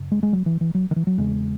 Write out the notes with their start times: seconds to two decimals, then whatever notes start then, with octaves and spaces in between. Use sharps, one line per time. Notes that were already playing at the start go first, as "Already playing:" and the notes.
Already playing: F#2 C#3
0.12 G#3
0.23 G#3
0.33 F#3
0.46 E3
0.61 E3
0.75 F#3
0.91 D#3
0.96 E3
1.07 F#3
1.18 E2 C#3 G#3